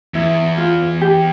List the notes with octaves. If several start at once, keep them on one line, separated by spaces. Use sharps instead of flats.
E2 E4
F4
G4